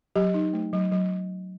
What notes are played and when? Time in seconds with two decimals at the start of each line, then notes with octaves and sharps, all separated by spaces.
0.16 F#3 G4
0.34 D#4
0.53 A3
0.73 F#3
0.92 F#3